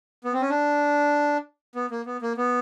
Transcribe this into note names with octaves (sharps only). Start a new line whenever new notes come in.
B3
C4
C#4
D4
B3
A#3
B3
A#3
B3